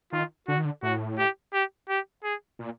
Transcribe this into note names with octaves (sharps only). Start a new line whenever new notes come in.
D#3 F4
D3 F#4
D#3
D3
A2 F#4
G4
G4
G4
G#4
A#2